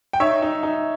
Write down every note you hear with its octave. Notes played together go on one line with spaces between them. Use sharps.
G5
D#4 C#5 E5
D#4
D#4